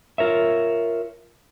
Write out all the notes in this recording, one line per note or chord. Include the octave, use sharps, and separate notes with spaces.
F4 A#4 C#5 E5